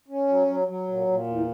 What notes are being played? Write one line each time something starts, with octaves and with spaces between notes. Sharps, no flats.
C#4
F#3
F#3
F#3
A#2
A#2
E2